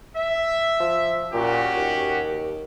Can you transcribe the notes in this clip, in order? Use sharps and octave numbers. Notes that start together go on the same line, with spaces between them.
E5
F3
A#2 C#4 F#4 G4
D#2